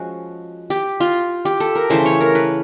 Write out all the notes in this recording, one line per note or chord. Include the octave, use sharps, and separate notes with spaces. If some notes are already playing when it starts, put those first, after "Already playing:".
Already playing: F3 G#3 C#4 F#4
G4
F4
G4
A4
A#4
C#3 E3 A3 C5
C#5
A#4
B4